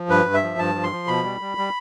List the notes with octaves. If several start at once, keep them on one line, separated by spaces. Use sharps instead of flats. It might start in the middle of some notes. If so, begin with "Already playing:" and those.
Already playing: F3
G2 B4
G2
E5
F3
G2 A5
F3
C6
F3
B2 B5
G3
G3
G3